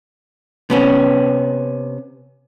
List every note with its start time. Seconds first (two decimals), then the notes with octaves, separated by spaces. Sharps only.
0.70 C3 B3 C#4